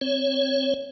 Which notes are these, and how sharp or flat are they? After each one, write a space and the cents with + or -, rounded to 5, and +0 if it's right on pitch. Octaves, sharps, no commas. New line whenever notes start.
C4 +0 C#5 +0